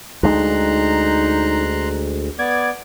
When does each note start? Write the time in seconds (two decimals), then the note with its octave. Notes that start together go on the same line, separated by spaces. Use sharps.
0.23 D2 G#3 D#4 A#5 C6 F#6
2.39 B3 D5 D6 G#6